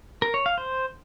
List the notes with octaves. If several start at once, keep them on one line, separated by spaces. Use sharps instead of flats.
A#4
C#5
F5
C5